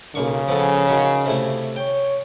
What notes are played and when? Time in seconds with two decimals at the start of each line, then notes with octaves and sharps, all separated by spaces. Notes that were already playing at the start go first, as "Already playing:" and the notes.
0.15 B1 C#3 A#3 C#6
0.48 F3 B3 A4
0.88 D#3 F#3
1.26 C3 A3 E4
1.76 C#5 G5